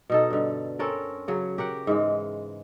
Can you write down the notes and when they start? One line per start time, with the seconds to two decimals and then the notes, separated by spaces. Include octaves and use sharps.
0.10 B2 D#4 A4
0.30 G2 D3
0.79 C4 C#4 A4 A#4
1.28 C#3 F#3
1.58 G4 A#4 F#5
1.87 G#2 E3 G#3